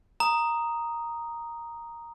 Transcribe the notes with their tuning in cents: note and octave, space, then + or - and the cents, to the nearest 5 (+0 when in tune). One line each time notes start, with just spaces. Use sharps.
A#5 +0 D#6 +0